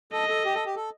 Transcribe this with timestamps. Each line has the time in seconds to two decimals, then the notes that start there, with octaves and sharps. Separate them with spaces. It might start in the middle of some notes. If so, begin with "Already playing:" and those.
0.12 A4 D#5
0.29 A4
0.45 G4
0.55 A4
0.66 G4
0.76 A4